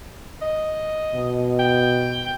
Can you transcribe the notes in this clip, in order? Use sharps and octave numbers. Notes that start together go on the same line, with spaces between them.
D#5
B2
G5